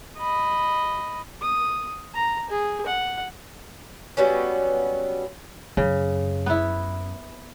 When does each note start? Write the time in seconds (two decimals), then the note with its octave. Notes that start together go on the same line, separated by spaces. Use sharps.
0.19 D#5 B5
1.41 D#6
2.15 A#5
2.50 G#4
2.86 F#5
4.17 F#3 G3 B3 C#4
5.77 F#2 C#3
6.46 B3 E4